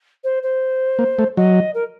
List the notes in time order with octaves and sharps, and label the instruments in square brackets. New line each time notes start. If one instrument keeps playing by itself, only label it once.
[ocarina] C5
C5
[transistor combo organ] A#3
A3
[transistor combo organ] F#3 [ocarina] D#5
[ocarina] A#4